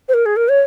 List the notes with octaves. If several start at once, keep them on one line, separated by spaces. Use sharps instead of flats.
C5
A#4
G#4
A#4
C#5